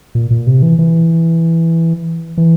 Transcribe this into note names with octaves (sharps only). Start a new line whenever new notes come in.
A#2
A#2
C3
E3
E3
E3